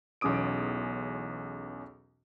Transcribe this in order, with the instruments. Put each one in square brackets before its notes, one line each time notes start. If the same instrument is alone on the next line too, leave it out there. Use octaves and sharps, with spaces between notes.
[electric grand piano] B1 E2 C#4 D6 D#6 D7